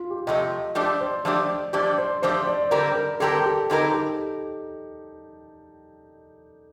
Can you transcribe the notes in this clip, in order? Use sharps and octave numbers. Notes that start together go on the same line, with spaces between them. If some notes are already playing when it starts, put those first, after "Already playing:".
Already playing: F4
G4
C3 F3 A3 D#5
F3 A3 D4 G4 D5
C5
F3 A3 D4 G4 D5
F3 A3 D4 G4 D5
C5
F3 A3 D4 G4 C5
D5
D3 G3 C4 G4 A#4 D5
A#4
D3 G3 C4 G4 A4 A#4
G4
D3 G3 C4 D#4 G4 A#4
A4
G4